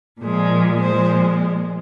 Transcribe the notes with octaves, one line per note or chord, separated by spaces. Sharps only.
A#2 F3 G#3
A#2 F3 G#3 C5